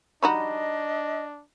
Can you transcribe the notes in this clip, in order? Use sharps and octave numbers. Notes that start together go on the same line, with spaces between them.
G3 D4 D#4 F#4 D#5 A#5 B5 C#6